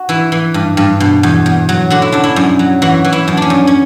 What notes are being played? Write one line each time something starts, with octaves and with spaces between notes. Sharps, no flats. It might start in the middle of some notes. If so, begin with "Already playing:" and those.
Already playing: F#4
E3 E4
E3
G2
G2
B2
E2
E2
F#3
D3 F#4
E4
F#2 D4
E4
F#2
F#3
E3 F#4
E3
E4
F#2
C#4 D4
F#2
C#4